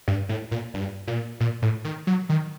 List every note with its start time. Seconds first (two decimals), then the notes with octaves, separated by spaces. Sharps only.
0.08 G2
0.29 A2
0.51 A#2
0.74 G2
1.07 A#2
1.40 A#2
1.62 A2
1.85 D#3
2.07 F#3
2.29 D#3